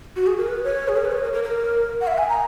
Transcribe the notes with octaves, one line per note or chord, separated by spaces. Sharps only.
F#4
G#4
A#4
B4
C#5
G#4
A#4
B4
C#5
A#4
A#4
A#4
F#5
E5
G#5
A#5